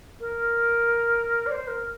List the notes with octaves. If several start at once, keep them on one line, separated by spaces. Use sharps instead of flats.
A#4
D5
C5
A#4